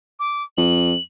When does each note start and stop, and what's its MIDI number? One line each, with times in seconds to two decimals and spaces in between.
0.20 0.43 86
0.57 0.94 41
0.57 1.02 102